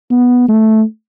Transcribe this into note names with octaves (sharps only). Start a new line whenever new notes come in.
B3
A3